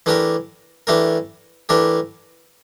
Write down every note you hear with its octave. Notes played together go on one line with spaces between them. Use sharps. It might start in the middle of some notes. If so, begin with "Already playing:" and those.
E3 A3 D4 G4 A#4
E3 A3 D4 G4 A#4
E3 A3 D4 G4 A#4